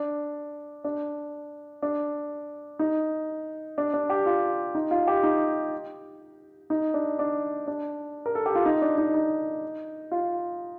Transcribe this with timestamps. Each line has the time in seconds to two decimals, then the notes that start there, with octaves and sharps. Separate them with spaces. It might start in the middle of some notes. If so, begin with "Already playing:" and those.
Already playing: D4
0.84 D4
1.82 D4
2.79 D#4
3.78 D4
3.94 D4
4.10 G4
4.26 F4
4.75 D#4
4.91 F4
5.07 G4
5.23 D#4
6.70 D#4
6.94 D4
7.19 D4
7.67 D4
8.26 A#4
8.35 A4
8.46 G4
8.55 F4
8.66 D#4
8.82 D4
8.98 D#4
9.14 D#4
10.11 F4